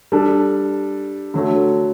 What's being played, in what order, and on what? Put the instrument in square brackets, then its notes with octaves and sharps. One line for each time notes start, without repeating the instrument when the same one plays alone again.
[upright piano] G3 D4 A4
D3 F#3 A3